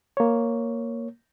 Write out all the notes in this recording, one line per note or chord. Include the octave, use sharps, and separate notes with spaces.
A#3 C#5